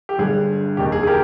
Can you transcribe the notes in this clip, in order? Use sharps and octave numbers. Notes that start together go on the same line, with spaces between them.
G4
G1 G2 D3 G#4
F1 D#2 D#3 A#3 G4
G#4
G#4
G4 A#4